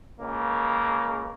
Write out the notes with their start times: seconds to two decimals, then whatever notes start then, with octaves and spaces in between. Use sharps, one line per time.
0.21 C#2 C#3 A#3